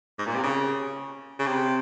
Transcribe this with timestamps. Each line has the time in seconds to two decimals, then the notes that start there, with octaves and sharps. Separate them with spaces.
0.18 G#2
0.26 A#2
0.35 C3
0.43 C#3
1.39 C#3
1.46 C3